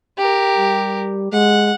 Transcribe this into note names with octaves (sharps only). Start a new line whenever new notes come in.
G4 A#4
G3
G#3 F#5